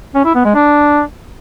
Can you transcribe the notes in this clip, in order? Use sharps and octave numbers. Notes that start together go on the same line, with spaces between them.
C#4
E4
B3
G#3
D4